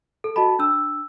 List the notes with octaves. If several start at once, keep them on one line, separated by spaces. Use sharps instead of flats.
A4
F#4 D#5 A5 B5
D4 E6